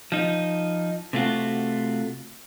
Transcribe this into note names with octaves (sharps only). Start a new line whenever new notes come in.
F3 D#4
C3 A3 F4 F#4